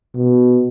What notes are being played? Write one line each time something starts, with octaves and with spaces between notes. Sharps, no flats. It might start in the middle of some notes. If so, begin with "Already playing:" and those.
B2